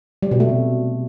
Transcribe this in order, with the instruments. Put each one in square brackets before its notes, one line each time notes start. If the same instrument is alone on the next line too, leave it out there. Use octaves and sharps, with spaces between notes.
[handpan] G3
B2
A3
C3